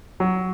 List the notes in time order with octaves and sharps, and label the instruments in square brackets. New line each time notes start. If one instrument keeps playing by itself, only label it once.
[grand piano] F#3